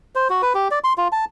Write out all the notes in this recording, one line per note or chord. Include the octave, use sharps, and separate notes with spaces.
C5
F#4
B4
G4
D5
C6
F4
A5